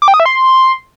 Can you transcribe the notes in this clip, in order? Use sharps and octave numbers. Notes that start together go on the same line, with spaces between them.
D6
G5
D#6
E5
C6